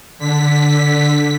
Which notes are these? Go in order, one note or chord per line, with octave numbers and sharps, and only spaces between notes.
D3 B6